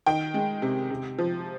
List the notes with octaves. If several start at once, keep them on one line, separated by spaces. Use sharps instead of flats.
D#3 G5
G#3
C3
C3
F3